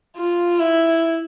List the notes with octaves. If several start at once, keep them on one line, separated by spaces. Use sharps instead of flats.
F4
E4